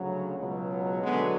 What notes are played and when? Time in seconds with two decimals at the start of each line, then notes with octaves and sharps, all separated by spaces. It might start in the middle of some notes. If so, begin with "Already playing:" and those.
Already playing: D2 C#3 F#3
0.37 C#2 B2 F#3
1.02 D2 D3 F#3 G#3 B3